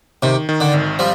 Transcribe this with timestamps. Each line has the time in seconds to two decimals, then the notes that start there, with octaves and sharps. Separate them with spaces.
0.23 C3 D#3
0.49 D#3
0.60 D3
0.74 G#1
0.99 F3 G3